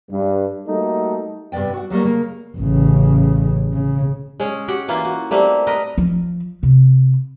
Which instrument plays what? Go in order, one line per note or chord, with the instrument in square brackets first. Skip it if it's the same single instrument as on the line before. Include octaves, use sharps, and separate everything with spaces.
[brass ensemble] G2
G3 A3 A#3 D#4 F#4 A4
[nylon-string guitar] G2 C3 B3 D5 G5
F#4 F#5
F#3 G3 A3 A#3
C#3 A#3
[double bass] A1 C#3
C#3
[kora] G#3 C#4
F#4 G4 F#5 G5
E3 A#3 E4 F4
F#4
G3 A3 A#3 C4
A#4 B4 D#5
[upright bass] F3
C3